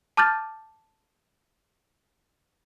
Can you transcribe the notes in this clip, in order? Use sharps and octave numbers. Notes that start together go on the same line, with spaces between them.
A5 D6 F6 G6 A6